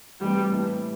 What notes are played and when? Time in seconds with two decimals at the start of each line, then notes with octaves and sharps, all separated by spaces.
0.20 C3 E3 G3 A3 C4
0.52 A2 E3 A3 E4 B4